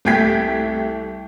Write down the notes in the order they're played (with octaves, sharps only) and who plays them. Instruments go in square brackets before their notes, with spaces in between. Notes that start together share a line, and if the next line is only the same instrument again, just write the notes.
[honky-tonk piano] C2 A3 G5 G#6 B6